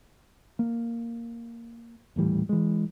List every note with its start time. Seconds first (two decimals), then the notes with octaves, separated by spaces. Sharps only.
0.59 A#3
2.16 D#1 A2 E3 G3
2.49 E3 G#3